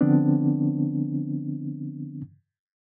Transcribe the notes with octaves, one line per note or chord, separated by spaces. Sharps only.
D3 F3 B3 C4 D4